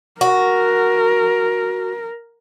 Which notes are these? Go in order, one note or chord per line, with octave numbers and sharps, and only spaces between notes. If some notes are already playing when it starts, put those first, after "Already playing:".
F#4 A#4